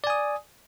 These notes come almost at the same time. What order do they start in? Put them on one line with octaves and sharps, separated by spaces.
D5 G#5 D#6